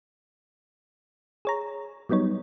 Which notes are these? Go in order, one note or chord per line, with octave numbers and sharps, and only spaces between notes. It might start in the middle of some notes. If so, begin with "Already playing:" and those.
G#4 C#5 A#5
F#3 G3 B3 D#4 C#5